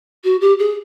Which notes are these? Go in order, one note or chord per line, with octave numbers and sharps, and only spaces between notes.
F#4
G4
G#4